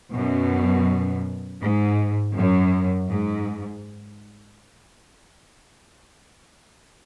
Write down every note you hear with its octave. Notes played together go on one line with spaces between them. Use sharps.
F#2 B2
G#2
F#2
G#2